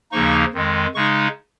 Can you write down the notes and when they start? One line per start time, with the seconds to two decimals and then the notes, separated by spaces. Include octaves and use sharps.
0.12 D#2 C#3 F3 A#3 D#4 C#6
0.54 F2 D#3 G#3
0.94 C#3 G#3 D#4 C#6